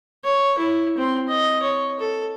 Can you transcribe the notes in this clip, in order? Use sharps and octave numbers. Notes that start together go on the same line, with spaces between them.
C#5
E4
C4 C6
D#5
C#5
A4